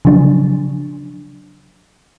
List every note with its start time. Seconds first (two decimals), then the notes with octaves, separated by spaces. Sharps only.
0.05 C#3 F3 F#3 D4